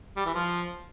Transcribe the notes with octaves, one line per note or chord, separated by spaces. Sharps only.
G3
E3
F3